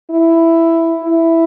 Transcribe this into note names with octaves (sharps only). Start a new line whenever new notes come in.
E4
E4